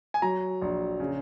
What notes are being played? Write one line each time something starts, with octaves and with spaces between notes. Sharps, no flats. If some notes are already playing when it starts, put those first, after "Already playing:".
G#5
F#3 A#5
A#1
C#3